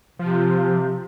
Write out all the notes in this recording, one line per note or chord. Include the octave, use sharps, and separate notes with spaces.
C3 F3